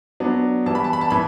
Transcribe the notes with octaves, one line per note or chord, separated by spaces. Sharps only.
F#3 B3 D4
E3 G3 B3 A5
B5
A5
B5
A5
E3 B5